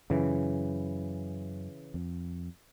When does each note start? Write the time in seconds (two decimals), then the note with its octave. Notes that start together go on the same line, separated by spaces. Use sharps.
0.10 F#2 C#3 E3
1.94 F2